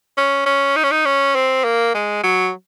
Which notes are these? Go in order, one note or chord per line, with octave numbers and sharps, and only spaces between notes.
C#4
C#4
D#4
C#4
D#4
C#4
C4
A#3
G#3
F#3